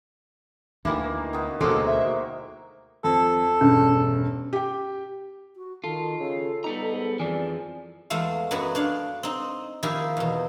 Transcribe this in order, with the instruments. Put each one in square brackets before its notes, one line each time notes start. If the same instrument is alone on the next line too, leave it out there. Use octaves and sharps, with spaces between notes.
[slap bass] D2 [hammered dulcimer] D#3 E3 A#3 [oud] E4
[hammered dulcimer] D#3 B3
[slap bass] D2 B2 [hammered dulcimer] F#3 G#3 A#3 [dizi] A4 [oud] C5
[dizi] E5
[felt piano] F2 [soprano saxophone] A4
[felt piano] E1 G2 [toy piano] C#4
[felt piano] G4 G5
[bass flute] F#4
[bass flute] D#3 [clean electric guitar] F4 [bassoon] A4
[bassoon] C#3 [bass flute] A4
[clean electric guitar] G3 B3 A#5 [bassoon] D#4
[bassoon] G#2
[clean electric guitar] F2 E3 F3 [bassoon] G#4 [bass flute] D5
[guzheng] E2 G#3 A3 F5
F#2 F#3 B3 F#4 B4 C#5
D4 C#5 F5
C4 D#4
D#3 F3 A#3 E4 G4 G#4
E2 B2